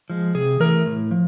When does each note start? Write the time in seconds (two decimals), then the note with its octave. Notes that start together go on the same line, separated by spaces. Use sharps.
0.10 F3 G#3
0.34 C3 G#4
0.60 E3 A3 A#4
0.86 A2
1.11 F3